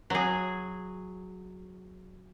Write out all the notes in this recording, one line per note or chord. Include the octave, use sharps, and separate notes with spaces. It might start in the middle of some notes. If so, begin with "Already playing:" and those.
F#3 G#4